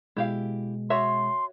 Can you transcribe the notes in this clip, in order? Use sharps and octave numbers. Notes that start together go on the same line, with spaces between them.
B2 G#3 E4 G4 F5
F#4 C#5 E5 C6